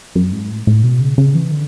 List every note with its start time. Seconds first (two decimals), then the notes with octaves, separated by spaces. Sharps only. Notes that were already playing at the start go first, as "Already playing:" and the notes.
0.15 F#2
0.33 G#2
0.50 A2
0.67 A2
0.84 B2
1.00 C#3
1.18 C#3
1.35 E3
1.52 D3